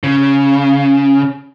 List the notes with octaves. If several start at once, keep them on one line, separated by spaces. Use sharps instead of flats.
C#3